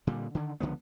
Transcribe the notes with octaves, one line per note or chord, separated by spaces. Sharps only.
A#2 D3 G3
D3 D#3
C#2 D3 F3 B3